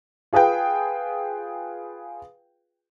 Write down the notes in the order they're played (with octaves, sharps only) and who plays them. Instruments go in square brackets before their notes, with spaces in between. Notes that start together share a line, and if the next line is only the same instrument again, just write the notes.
[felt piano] F4 G#4 B4 F5 G5